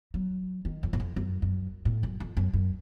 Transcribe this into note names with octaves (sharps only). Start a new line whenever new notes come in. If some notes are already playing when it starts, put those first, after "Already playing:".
F#3
D#3
F2
F#2
F2
F#2
F#2
A2
F#2
F2
F#2
F#2